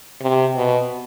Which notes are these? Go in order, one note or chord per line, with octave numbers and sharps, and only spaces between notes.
C3
B2